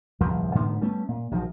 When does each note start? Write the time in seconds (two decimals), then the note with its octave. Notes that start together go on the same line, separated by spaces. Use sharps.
0.20 D1 C2 F2 F3
0.55 G#2 D3 D#3 B3
0.81 G3 A3 B3 C#4
1.08 A#2
1.31 A#1 D#3 F3 F#3